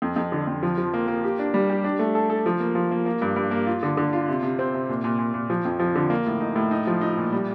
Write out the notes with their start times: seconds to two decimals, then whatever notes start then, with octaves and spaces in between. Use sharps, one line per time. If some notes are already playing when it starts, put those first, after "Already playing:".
0.02 F2
0.16 F2
0.32 D3
0.47 F2
0.63 F3
0.78 F3
0.94 A#3
1.08 A#3
1.24 G4
1.39 D4
1.54 G3
1.70 G4
1.84 D4
1.99 A3
2.15 A4
2.30 A4
2.46 F3
2.60 A#3
2.75 F3
2.91 A#3
3.06 A#3
3.21 G2
3.36 G2
3.51 A#3
3.67 F4
3.83 D3
3.97 D3
4.13 F4
4.28 C3
4.43 C3
4.59 C4
4.74 C3
4.89 A#2
5.04 A#2
5.19 A#2
5.34 A#2
5.50 F3
5.65 F2
5.79 F3
5.96 D3
6.10 A#3
6.26 A2
6.40 D#4
6.56 A2
6.71 D#4
6.87 F3
7.01 D#4
7.18 A#2
7.32 G3